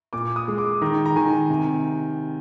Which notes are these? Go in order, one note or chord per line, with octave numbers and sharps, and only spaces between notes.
A#2 D6
D#6
G#3
D6
D#3 A#5
A#5
D#3 G#5
C3